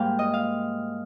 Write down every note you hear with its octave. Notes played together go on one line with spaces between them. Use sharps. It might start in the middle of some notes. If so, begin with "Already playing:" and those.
Already playing: G#2 G3 A#3 F5 G5
D#5
F5